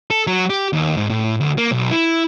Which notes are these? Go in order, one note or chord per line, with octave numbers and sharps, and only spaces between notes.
A4
F#3
G4
D#2
G#2
A2
D2
A#3
B1
E4